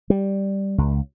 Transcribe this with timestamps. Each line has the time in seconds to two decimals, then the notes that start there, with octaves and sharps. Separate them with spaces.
0.10 G3
0.78 C#2